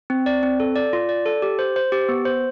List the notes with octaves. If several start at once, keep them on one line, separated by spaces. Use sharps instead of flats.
C4
D5
C4
A4
D5
F4
D5
A4
G4
C5
C5
G4
B3
C5